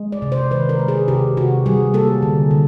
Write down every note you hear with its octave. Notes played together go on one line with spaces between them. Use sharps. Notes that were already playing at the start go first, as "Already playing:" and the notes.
Already playing: G#3
D5
C3
C5
D#3 B4
A#4
G#3
G#4
C3 G4
C3 F#4
G3 G#4
A#3 A4
D3
D3